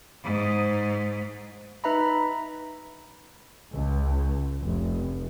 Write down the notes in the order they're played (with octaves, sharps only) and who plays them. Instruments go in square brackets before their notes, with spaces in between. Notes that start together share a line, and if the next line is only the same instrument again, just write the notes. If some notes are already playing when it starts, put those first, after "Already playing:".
[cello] G#2
[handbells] D#4 B4 E5 A#5 B5
[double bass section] C#2
F1